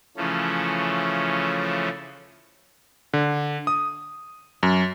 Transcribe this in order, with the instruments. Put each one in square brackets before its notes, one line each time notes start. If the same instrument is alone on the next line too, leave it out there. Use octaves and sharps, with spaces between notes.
[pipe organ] C#3 E3 F3 A3 C#4
[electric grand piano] D3
D#6
F#2